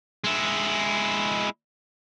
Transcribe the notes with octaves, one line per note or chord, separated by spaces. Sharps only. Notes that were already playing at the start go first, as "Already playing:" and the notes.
G#3 E4